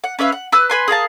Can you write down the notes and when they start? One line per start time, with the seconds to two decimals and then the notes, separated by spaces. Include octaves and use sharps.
0.04 F#5
0.19 C#4 B4 E5 F5
0.32 F#5
0.52 B4 E6 F#6
0.70 B4 G#5 C6
0.88 G#4 A#4 F5 A5